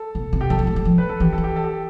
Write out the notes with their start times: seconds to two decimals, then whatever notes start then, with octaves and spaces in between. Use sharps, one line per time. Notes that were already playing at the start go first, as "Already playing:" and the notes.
Already playing: A4
0.15 B2
0.33 C3
0.41 G4
0.50 E2 A4
0.59 F2
0.67 A2
0.76 G3
0.85 F3
0.98 B4
1.09 A4
1.20 E3 G4
1.33 A4
1.38 E3
1.44 G4
1.56 A4
1.64 G4
1.71 A4